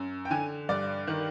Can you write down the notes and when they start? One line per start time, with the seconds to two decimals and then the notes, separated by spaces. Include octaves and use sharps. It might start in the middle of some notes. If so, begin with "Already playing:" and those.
Already playing: F#2
0.25 G5
0.31 D3 G#5
0.69 G2 D5
1.07 D#3